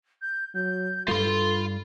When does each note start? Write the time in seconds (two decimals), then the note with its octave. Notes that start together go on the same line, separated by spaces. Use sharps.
0.22 G6
0.54 F#3 G6
1.08 G2 G3 F4 A4 B5 C6